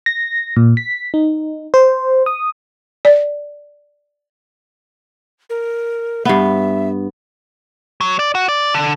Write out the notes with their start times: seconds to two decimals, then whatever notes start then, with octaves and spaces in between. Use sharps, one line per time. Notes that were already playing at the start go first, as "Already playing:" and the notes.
0.06 A#6
0.56 A#2
0.77 B6
1.14 D#4
1.74 C5
2.26 D#6
3.05 D5
5.50 A#4
6.25 G2 B3 E5
8.01 F#3
8.19 D5
8.35 F#4
8.48 D5
8.74 D3